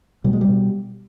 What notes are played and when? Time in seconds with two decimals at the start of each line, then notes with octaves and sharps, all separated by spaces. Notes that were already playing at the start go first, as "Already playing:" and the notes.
0.24 B2 G3
0.33 G#3
0.41 G3
0.48 B2